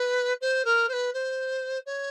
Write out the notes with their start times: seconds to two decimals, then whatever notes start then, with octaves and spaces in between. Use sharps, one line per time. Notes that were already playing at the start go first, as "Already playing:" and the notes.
Already playing: B4
0.41 C5
0.65 A#4
0.88 C5
0.93 B4
1.13 C5
1.86 C#5